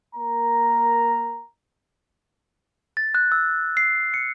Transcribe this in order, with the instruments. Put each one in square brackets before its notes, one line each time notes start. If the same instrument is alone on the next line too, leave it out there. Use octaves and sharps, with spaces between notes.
[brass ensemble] A#3 A#4 A#5
[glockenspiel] A6
F#6
E6
C7
C#7